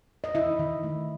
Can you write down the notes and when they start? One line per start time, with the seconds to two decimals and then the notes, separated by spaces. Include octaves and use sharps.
0.24 D#5
0.35 D#3 E4 E5
0.59 D#3
0.83 A3